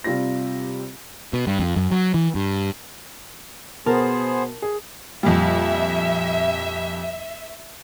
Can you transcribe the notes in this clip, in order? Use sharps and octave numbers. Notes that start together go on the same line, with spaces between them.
C3 G3 F4 G4 A#6
B2
G2
F2
F#2
F#3
E3
G2
B2 B3 G#4 A#4 C5 A5
G#4
F2 A#2 G3 E5